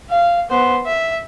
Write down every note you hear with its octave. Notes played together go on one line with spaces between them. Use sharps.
F5
B3 C5
E5